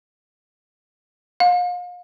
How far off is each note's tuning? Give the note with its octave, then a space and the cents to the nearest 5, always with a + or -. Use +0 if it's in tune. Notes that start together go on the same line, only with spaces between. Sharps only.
F5 +35